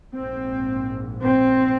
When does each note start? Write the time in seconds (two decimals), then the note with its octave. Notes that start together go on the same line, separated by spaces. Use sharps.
0.13 A#1 G#2 C4
1.21 C4